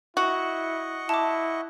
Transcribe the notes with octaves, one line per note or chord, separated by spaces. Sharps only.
E4 F#4 D#5 F#5 C#6
E4 A5 D6